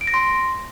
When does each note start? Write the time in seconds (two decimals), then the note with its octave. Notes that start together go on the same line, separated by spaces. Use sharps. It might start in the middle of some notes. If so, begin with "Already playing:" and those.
0.01 D7
0.07 A#6
0.14 C6